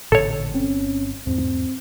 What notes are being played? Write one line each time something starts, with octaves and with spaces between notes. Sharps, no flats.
A1 A#2 D3 A4 C#5
G1 C4 C#4
E2 G#2 C4